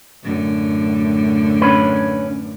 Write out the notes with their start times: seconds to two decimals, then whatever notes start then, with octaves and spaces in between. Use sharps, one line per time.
0.24 F#2 A2 D3
1.61 C#4 B4